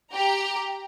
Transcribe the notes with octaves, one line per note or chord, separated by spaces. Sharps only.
G4 A#5